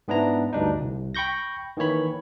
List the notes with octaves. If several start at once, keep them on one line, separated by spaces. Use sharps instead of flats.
G#2 B3 D4 E4 A#5
D2 G2 D4 D#4
C2
G5 B5 C#6 G6 A#6
D#3 E3 A#3 C#5 B5